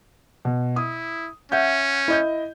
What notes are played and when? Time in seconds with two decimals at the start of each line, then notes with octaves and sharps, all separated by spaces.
0.45 B2
0.76 E4 D#6
1.52 C#4 E5 F#5 G6
2.08 E4 D#5 G6